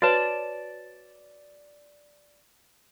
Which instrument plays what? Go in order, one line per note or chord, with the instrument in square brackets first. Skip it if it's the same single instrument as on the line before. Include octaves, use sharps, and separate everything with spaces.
[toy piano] F#4 B4 C#5 [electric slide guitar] D5 A5